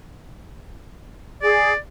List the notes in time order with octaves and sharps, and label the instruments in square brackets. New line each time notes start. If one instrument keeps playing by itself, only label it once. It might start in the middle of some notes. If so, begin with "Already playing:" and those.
[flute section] G#4 [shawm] D5